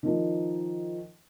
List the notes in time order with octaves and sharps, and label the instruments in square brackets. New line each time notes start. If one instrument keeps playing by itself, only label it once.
[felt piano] D#3 F3